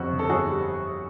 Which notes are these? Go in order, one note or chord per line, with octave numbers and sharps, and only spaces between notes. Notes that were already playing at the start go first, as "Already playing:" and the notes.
Already playing: G1 F2 G3 F#4
D3
A4
G1 F#4 G#4
G3